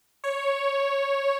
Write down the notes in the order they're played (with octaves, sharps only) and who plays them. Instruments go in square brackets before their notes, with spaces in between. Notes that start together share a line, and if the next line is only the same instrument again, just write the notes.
[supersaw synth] C#5